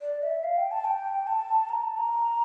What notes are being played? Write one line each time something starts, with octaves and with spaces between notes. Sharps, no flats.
D5
E5
F5
G5
A5
G5
A5
A#5
A5
A#5